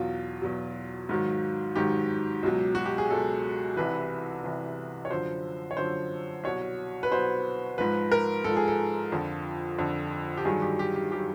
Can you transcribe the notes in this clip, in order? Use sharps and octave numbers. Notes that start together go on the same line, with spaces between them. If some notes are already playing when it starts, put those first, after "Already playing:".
Already playing: E2 B2 F#3 F4
E2 B2 F#3
G#2 D#3 F#3
G#2 D#3 F#3 G4
C#2 B2 F#3
F#4
G4
G#4
C#2 B2 F#3 A4
C2 C3 E3 B4
C2 C3 E3
C#5
F#2 D3 F3 C5
C#5
F#2 D3 F3 C5
C2 B2 F#3 C#5
B4
C2 B2 F#3 C5
G#2 F3 B4
A#4
G#2 F3 A4
G#4
A4
F2 D3 F3
F2 D3 F3
G4
G2 D#3 F#3 G#4
G4
G4
G4
D#3 F#3 G4